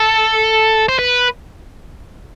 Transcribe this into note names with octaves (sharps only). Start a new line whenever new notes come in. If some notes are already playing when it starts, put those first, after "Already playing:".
Already playing: A4
C5
B4